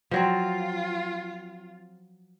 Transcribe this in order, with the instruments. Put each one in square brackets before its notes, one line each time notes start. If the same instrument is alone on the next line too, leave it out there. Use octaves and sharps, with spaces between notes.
[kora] F3 F#3 C4 [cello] F4